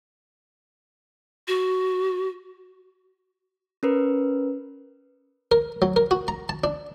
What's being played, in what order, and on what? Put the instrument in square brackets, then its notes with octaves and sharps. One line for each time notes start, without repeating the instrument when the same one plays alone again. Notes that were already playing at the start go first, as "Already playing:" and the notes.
[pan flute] F#4
[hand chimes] C#4 A#4 B4
[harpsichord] A#4
F#3
A#4
F#4
A#5
A5
D4